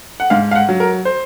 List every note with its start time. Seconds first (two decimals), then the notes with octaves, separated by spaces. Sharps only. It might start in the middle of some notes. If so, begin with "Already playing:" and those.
0.20 F#5
0.30 G#2 F5
0.51 F5
0.55 F#5
0.69 F#3
0.80 A#4
1.05 C5